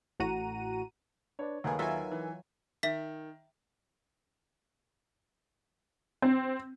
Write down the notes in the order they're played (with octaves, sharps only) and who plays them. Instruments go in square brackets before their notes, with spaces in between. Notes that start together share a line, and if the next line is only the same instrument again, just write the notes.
[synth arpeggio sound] A1 A2 F#4 F#5 A#5 D#7
[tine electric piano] D4 B4 D5 [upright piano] C#5
[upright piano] D#2 [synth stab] F#3 A3 G#4 [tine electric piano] D#4 A#4 B4
[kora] F#3 F4 A4 [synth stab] E5 G#5
[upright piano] E3
[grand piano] D#3 [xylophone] E5 B6
[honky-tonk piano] C4